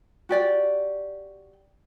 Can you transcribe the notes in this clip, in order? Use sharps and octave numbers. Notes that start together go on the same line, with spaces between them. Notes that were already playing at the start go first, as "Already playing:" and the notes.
F#4 G4 D5 G5